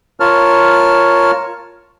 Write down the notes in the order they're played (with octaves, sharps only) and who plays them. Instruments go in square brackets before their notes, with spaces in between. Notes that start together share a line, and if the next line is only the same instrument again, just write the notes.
[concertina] F4 A#4 C#5 A5 F6